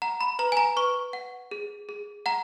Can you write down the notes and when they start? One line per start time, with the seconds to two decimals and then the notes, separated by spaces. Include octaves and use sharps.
0.02 F#5 A#5
0.21 B5
0.39 B4 A#5
0.52 G#5
0.57 A#5
0.77 B4 C#6
1.13 F#5
1.51 G#4
1.89 G#4
2.26 F#5 A#5